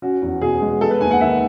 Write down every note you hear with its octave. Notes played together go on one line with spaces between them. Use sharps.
C#4 F#4
E2
B2 G#4
G#3
B3 A4
B4
D#2 G#5
F#5
D#3 E5